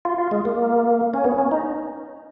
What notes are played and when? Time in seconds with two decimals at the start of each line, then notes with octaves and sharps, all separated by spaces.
0.05 F4
0.18 F4
0.31 G#3
0.45 A#3
1.14 C#4
1.25 B3
1.38 C#4
1.51 D#4